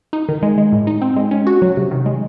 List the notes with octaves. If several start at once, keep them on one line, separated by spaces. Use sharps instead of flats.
D#4
D#3
G#3
G#3
A2
D#4
C4
G#3
C#4
F#4
F#3
C3
D#3
G#3